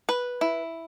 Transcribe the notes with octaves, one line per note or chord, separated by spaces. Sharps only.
B4
E4